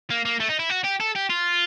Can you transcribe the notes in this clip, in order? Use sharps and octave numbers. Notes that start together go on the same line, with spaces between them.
A#3
A#3
A3
D#4
E4
F#4
G4
A4
G4
F4